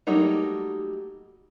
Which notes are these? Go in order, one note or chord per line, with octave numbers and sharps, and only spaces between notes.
F#3 G3 A3 A#3 D#4